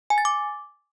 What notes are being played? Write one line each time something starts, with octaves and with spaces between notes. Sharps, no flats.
G#5
A6
D6